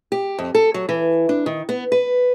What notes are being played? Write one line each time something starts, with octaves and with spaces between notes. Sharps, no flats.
G4
F2
A4
F#3
E3
D4
D#3
B3
B4